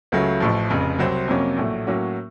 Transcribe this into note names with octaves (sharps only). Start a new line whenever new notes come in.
C#2 C#3 F#3 A3
A1 A2 F3
F1 F2 C#3
C2 C3 F#3 C4
F2 C3 F#3 A#3 C#4
A#1 A2 F#3 A3
A2 F#3 A#3 C#4 F#4